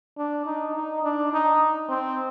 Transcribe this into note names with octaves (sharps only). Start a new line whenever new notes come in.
D4
D#4
D#4
D4
D#4
C4